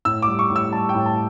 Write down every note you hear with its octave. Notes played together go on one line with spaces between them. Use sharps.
A2 E6
D6
G3
C#6
A2
E6
G3 A5
G5
A2
A5